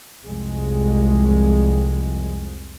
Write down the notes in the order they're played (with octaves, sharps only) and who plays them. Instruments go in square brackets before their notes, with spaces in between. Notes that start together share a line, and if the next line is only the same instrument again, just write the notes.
[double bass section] C2 F2 G#3